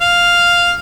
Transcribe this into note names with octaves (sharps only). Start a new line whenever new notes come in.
F5